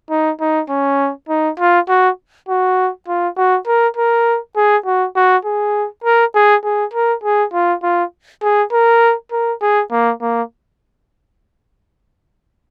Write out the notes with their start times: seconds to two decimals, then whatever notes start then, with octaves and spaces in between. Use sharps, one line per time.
0.10 D#4
0.40 D#4
0.70 C#4
1.29 D#4
1.59 F4
1.89 F#4
2.49 F#4
3.08 F4
3.37 F#4
3.67 A#4
3.97 A#4
4.56 G#4
4.86 F#4
5.16 F#4
5.45 G#4
6.04 A#4
6.35 G#4
6.64 G#4
6.94 A#4
7.24 G#4
7.53 F4
7.83 F4
8.42 G#4
8.73 A#4
9.32 A#4
9.62 G#4
9.91 A#3
10.21 A#3